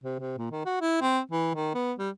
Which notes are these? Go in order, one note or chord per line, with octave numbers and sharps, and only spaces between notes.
C3
C3
A#2
D#3
F#4
E4
C4
E3
D#3
B3
G3